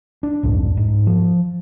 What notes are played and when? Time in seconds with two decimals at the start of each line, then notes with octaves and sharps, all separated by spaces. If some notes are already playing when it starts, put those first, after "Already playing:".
0.23 D4
0.43 C2 F2 G#2
0.77 G#2
1.06 F3